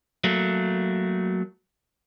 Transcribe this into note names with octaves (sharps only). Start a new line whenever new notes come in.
F#3 A3 A#3